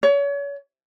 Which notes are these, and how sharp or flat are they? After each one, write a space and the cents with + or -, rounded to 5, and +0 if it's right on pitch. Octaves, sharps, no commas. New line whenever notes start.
C#5 +35